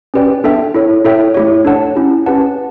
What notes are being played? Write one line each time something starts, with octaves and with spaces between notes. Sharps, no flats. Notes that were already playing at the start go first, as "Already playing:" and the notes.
C#4 G4 B4 D5 G5
B3 D4 A4 E5 G5
E4 A4 C#5
E4 A4 C#5 E5 G5
A3 E4 G4 C#5
D4 A4 C#5 F#5 A5
C#4 E4 G4
C#4 G4 B4 F#5 A5